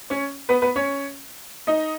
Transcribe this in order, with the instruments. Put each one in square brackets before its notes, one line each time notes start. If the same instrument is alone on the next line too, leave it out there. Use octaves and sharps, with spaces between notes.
[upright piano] C#4 C#5
B3 B4
B3 B4
C#4 C#5
D#4 D#5